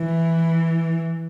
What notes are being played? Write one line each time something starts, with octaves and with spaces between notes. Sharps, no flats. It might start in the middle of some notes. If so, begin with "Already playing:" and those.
Already playing: E3